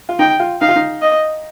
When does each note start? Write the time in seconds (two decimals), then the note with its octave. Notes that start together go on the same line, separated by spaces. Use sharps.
0.09 F4
0.19 D#4 G5
0.40 F4
0.61 D#4 F5
0.68 F4
0.76 D#4
1.02 D#5